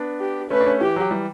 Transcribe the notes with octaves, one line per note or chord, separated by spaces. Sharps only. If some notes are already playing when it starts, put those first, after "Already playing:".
Already playing: B3 D4
G4
A3 C#4 B4
D4
A3 C#4
E3 G4
F#3
E3 G3